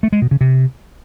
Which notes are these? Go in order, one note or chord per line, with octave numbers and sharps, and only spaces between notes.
A3
G#3
B2
C#3
C3